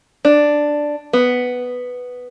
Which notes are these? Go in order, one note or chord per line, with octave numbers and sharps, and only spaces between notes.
D4
B3